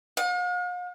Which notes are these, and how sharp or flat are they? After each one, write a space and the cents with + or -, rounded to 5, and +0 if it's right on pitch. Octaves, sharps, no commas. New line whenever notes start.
F5 +45